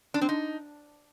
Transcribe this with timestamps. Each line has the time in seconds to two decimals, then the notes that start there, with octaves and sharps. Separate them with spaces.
0.14 D4
0.21 C4
0.29 D#4